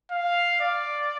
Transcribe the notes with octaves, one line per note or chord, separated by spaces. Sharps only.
F5
D5